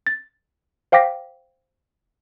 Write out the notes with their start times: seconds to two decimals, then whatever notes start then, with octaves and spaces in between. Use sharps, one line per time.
0.07 A6
0.92 C5 F5 G5 D6 A#6 B6